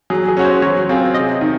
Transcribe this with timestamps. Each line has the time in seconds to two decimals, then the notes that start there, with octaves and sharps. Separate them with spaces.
0.10 F#3 G#4
0.29 G#4
0.37 C#4 F#4 C#5
0.45 C5
0.62 F#3 C#5
0.89 C4 F4 G#4
1.14 C3 D#5
1.41 D#3